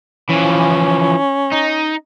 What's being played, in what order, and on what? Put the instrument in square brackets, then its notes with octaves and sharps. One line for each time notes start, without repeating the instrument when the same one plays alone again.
[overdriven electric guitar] E3 F3 [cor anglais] C#4
[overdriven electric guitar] D#4